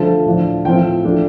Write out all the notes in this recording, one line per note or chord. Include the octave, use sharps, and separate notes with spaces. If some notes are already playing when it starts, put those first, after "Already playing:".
Already playing: D3 F3 A3 F4 A5
A2 F3 D4
A2 F3 C4 F4 G5
F3 A3 D4 F4